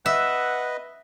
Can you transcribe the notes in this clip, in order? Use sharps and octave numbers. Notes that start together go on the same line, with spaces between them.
B4 D#5 E5 F#5